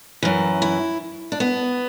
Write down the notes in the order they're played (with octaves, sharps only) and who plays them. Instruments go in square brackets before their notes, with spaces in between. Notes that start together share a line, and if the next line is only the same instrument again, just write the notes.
[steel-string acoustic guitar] F#2 E3
E4
D4
B3